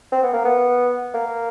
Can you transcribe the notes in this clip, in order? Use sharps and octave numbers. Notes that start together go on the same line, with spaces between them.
C4
B3
A#3
B3
A#3